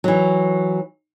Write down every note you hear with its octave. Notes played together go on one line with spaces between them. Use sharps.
E3 F#3